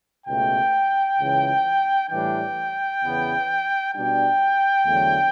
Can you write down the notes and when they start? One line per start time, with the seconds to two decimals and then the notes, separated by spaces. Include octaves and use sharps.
0.26 C#2 B2 A3 G5
1.18 C#2 C#3 E3
2.09 A2 E3 G3 D4 G5
3.02 E2 C#3 E3 B3
3.93 B2 G3 D4 G5
4.85 E2 D3 F#3 A3